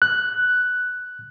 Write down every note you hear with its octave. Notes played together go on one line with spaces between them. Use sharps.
F#6